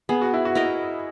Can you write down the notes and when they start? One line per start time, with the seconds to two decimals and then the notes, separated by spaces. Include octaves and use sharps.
0.09 B3 G#4
0.21 F#4
0.34 E4
0.45 F#4
0.55 E4 A#4 D#5